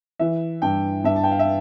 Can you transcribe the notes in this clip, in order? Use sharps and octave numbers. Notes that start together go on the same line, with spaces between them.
E3 E5
G2 G5
G2 E5
A5
G5
F5
E5